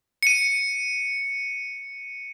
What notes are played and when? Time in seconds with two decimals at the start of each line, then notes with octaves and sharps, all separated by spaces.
0.23 C#7 D#7